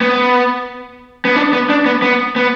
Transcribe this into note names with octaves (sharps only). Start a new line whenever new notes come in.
B3
B3
D4
B3
D4
B3
B3
B3